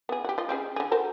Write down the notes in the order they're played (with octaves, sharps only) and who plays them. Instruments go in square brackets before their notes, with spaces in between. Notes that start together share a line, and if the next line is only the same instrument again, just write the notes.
[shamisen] B3 G#4
F#4 G4
F4 D#5
C4 C#4 G#4
D3 G#4
F#4 A#4 C5